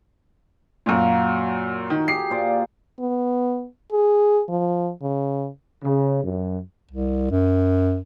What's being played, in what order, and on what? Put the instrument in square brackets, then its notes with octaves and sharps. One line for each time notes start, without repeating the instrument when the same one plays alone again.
[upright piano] F#2 A#2 [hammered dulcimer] F4 F#4 A#4
[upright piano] D#3
[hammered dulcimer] G4 G#4 [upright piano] C7
[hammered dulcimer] A#2 C5 D5
[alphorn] B3
G#4
F3
C#3
[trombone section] C#3
F#2
[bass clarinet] C2
F#2